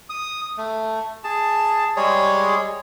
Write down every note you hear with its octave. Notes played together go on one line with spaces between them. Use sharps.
D#6
A3
G#4 A5
G3 G#3 G#4 C#5